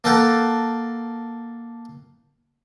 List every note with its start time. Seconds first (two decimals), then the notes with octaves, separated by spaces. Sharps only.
0.04 A#3 A4 A#4 F#5 G5 A5